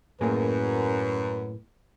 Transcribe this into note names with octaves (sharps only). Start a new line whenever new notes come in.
F#2 A2 A#3 G#4 B4